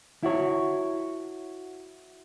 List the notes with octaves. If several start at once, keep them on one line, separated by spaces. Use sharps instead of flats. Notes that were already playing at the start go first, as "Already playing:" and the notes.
E4 F#4 C#5